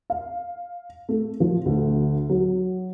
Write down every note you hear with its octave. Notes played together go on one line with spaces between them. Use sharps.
F5
A3
F3
D2
F#3